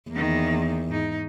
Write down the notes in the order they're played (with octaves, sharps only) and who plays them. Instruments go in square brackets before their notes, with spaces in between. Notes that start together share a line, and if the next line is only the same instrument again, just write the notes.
[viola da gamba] E2 [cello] D#3 A#3
[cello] G#2 D#4